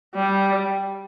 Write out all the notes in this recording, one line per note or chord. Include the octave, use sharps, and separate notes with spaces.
G3